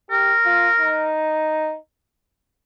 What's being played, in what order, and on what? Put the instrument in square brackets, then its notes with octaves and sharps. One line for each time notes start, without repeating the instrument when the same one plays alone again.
[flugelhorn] G4 [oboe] A#4
[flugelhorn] F4
D#4